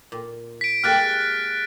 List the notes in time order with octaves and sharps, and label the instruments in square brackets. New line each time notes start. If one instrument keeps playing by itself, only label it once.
[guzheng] A#2
[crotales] B6 D7
[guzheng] G#3 A#3 G4 [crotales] F6 F#6 A6